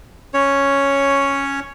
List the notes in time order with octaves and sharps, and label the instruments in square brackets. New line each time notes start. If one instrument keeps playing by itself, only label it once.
[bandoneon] C#4 C#5